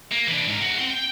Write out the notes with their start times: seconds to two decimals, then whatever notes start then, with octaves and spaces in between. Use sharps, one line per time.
0.12 A#3
0.28 E3 D4
0.46 G#2 A#4
0.60 E2 F#4
0.78 C4 C6
0.90 G5